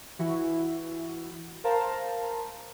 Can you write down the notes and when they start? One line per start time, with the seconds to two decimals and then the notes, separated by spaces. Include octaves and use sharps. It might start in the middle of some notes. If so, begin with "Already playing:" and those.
0.19 E3 E4 F#4
1.64 A#4 C5 F5 A5 A#5